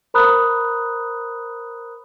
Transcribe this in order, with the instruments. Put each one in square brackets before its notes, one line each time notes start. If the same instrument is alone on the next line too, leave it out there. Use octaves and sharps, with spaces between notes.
[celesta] A#4 C5 A#5 B5 D#6 F#6